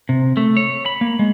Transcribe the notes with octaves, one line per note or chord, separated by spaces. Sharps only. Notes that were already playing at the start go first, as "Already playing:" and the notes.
C3
A3
C#5
B5
A#3
G#3